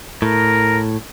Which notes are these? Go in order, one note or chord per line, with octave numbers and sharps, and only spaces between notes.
A2 A#4